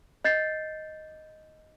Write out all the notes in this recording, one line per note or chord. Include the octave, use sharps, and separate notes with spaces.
D#5 G6 A6 C7